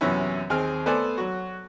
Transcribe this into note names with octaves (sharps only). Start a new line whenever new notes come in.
F#2 C3 E3 B3 C#4 E4
D#2 C4 G#4 F6
A3 B3 A4 C5 D5 G#5
F#3 F#4